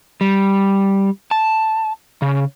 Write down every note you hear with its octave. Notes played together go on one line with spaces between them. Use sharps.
G3
A5
C#3